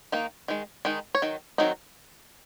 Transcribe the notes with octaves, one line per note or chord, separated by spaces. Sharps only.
D#3 A#3 D#4
D#3 G#3
D#3 G#3 D#4
C#5
D#3 F#3
D#3 F#3 C4 D#4